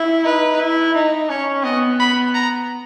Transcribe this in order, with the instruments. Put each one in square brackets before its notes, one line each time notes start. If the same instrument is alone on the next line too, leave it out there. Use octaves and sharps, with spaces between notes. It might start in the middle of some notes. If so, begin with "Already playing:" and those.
Already playing: [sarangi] E4
[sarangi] D#4 [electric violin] B4
[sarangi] E4
D#4
[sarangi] C#4 [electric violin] C#5
[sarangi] B3 [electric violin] D#5
[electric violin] B5
A#5